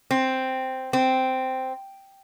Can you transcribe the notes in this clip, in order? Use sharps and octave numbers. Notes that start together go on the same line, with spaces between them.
C4
C4